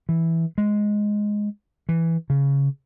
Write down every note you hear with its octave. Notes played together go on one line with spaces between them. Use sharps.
E3
G#3
E3
C#3